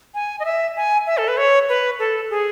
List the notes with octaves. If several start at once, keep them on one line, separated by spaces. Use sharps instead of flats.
G#5
D#5
E5
G#5
E5
A4
B4
C#5
B4
A4
G#4